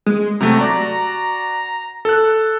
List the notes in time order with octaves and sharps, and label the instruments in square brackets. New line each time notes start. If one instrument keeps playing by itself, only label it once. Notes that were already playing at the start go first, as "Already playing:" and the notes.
[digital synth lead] G#3
[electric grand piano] C3 F#3 A3 [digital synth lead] A#5
[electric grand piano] F#4 D5
A4 F#6